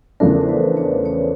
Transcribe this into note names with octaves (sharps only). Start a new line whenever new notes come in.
E2 C#3 F3 A3 D4 A#4
C5
B4
C#5
C#5